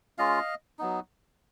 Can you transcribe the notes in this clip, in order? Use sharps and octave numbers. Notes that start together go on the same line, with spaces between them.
G#3 C#4 F4 D#5 F5
F#3 B3 D#4